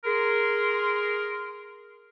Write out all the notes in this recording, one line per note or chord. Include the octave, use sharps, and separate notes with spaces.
G#4 A#4 C6